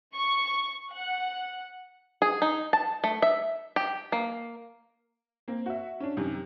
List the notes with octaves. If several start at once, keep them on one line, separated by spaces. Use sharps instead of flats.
C#6
F#5
G#4
D#4
A5
A3
E5
G4
A#3
A#3 C4
F#4 E5
C#4 D4
F#2 C3 D#3